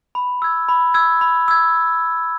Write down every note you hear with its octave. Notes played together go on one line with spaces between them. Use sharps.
B5
E6 G#6
B5
E6 G#6
B5
E6 G#6